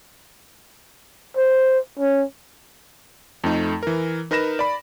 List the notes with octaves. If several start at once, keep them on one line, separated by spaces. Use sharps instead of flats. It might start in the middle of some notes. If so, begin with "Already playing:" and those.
C5
C#4
F2 A3 D#4
E3 A#4
D#4 A#4 B4 B5 A#6 E7
D5 B5